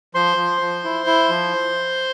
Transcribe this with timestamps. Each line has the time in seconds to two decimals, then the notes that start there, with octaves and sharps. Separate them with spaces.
0.15 F3 C5 C6
0.37 F3
0.61 F3
0.84 E4
1.07 E4
1.29 F3